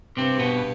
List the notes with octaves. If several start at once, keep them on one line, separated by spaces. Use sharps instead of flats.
G2 C3 C4
B2 B3